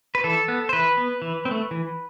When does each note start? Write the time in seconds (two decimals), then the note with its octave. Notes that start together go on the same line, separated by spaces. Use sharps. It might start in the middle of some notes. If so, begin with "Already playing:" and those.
0.15 B4
0.24 E3 A4
0.48 B3
0.69 C5
0.73 E3 B4
0.97 B3
1.22 E3
1.45 C4
1.51 A3
1.71 E3